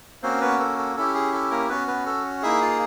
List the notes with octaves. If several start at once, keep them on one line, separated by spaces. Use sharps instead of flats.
A#3 C4 C#4 F#4 C5
B3 B4
A4
A4
C#4 E4 G4 A4
G#4
A4
A#3 A#4
B3 C#4 F#4 B4
B3 B4
A4
A#3 D#4 E4 G#4 E5
F4 F5